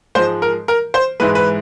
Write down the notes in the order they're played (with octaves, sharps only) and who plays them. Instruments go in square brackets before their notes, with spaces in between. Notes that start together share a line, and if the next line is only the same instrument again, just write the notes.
[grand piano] G#2 F3 G#3 C5
A#4
A#4
C5
G#2 E3 G#3 B4
B4